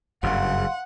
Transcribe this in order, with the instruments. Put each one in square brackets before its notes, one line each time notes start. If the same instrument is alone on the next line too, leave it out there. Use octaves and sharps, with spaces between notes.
[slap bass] F#1 G2 C#3 [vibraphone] F5 C6 [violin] F#5